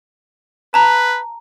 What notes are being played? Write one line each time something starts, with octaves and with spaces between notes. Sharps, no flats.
B4 A5 A#5